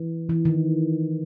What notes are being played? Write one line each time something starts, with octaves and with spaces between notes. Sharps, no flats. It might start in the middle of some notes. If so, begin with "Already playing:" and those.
Already playing: E3
E3
D#3